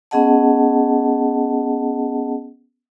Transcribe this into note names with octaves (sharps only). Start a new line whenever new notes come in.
B3 C#4 G#4 D#5 F#5 A5